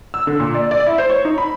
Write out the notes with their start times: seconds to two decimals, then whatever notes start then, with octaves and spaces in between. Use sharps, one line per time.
0.14 E6
0.27 D3
0.40 A#2
0.55 D5
0.71 D5
0.86 E4
0.98 C5
1.10 C#5
1.25 D#4
1.38 B5